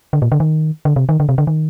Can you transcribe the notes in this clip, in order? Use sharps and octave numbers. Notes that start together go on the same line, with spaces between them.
D3
A#2
D3
D#3
D3
C3
D#3
D3
C3
D3
D#3